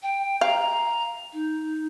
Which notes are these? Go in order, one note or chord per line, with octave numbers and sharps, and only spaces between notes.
G5
F5 A#5
D#4